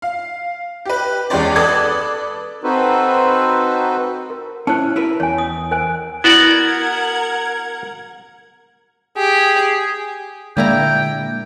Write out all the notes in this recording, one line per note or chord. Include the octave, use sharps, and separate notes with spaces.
F5
G4 B4
E2 G#3 C#4 G4 C#5 D5
A4 B4 D5 D#6 G#6
C4 D#4 F#4 A4 B4 C5
A#4
C#4 E4 C5 A5
E4 A#4 B4
E2 C#5 G#5
D#6
A#4 C5 G#5
B3 E4 F#4 A#4 D5 F#5 G#6
G4 G#4
A#2 D3 G#3 A#3 E4 G5 A#5